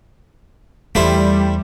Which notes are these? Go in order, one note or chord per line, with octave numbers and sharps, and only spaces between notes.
E2 G3 A3 E4 C5